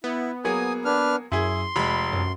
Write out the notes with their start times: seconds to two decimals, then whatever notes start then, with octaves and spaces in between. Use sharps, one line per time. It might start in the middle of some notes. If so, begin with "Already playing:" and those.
0.04 B3 E4
0.45 F#3 A#3 G#4 G#5 D#6
0.85 D4 B4 F6
1.32 F#2 E4 G#4 C6
1.76 F1 G#3 B5
2.13 F#2